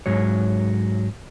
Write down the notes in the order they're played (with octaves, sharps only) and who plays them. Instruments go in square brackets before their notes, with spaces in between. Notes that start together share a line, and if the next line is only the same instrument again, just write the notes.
[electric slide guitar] G#2 F#3 C#5